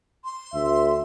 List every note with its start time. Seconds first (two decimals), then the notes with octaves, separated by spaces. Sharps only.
0.24 C6
0.54 D2 E5